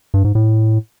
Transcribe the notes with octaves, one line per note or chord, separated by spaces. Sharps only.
G2
G#2
A2